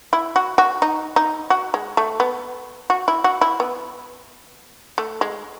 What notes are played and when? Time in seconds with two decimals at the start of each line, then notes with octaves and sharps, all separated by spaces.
0.13 E4
0.36 F#4
0.58 F#4
0.82 D#4
1.16 D#4
1.50 F#4
1.74 G#3
1.97 A3
2.20 B3
2.90 F#4
3.08 E4
3.24 F#4
3.41 E4
3.60 B3
4.98 A3
5.21 G#3